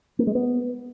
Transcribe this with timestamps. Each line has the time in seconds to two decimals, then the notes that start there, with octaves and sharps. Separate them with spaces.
0.19 A#3
0.27 G#3
0.35 B3